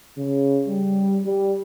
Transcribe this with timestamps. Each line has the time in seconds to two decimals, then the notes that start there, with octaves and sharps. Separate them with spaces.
0.18 C#3
0.68 G3
1.25 G3